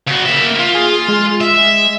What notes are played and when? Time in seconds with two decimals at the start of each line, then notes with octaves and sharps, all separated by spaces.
0.08 C#3 F#4
0.26 A#3 E5
0.60 F4
0.74 G#4
1.08 G#3
1.41 E5